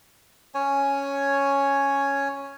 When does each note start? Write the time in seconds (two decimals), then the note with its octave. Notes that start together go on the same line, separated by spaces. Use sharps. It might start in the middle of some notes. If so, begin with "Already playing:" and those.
0.54 C#4 C#5 G#5